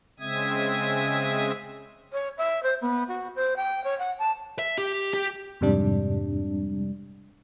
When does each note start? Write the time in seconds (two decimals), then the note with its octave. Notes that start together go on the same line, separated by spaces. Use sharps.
0.20 C#3 G#3 C4 E5 D#6 G#6
2.12 C#5
2.37 E5
2.62 C5
2.81 B3
3.08 F#4
3.35 C5
3.56 G5
3.84 C#5
3.98 F#5
4.18 A5
4.59 E5
4.78 G4
5.14 G4
5.61 F2 G#2 C3 G3 D4